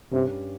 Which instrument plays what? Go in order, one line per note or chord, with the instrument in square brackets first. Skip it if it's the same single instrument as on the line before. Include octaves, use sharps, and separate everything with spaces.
[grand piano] G2 G3 C#4 G4 [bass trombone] C3